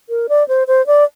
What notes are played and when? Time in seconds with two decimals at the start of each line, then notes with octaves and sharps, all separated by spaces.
0.09 A#4
0.29 D5
0.48 C5
0.67 C5
0.87 D5